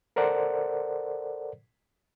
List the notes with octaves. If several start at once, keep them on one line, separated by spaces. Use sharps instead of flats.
A4 A#4 C5 D5 F#5